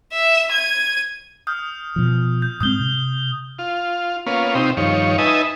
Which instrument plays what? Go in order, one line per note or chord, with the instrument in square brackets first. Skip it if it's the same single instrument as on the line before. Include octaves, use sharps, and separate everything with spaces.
[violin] E5
G#6 D#7
[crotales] D#6 F6 G6
[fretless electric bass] B2 F3
[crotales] G6
[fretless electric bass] G#2 G#3 C4 [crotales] D#6 G6 G7
[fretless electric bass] C3
[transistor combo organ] F4
A#3 B3 C#4 F4
C3 C4 D#4 G4
G2 D#3 F3 C#5
D#4 B4 D#5 E5 G#5 A5